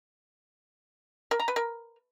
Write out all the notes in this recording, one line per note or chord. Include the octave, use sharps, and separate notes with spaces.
A#4
A#5
B4
A#4